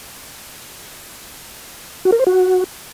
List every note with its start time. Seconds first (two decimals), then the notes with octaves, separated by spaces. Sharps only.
2.05 F#4
2.12 A#4
2.19 C5
2.27 F#4